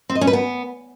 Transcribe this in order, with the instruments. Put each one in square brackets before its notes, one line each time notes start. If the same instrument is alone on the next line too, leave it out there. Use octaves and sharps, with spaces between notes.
[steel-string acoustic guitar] C4
D#5
C#4
B4
B3